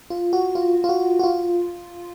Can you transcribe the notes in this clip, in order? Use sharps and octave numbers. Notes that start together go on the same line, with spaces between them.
F4
F#4
F4
F4
F#4
F#4
F4